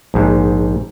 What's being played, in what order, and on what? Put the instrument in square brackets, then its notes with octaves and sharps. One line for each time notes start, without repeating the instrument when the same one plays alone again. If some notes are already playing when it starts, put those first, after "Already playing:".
[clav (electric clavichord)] A#1 G#2